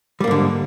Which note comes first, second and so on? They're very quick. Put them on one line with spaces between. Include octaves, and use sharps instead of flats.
G3 A#3 G#2 D3